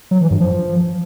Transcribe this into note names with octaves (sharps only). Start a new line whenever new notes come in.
F#3
E3
G2
F3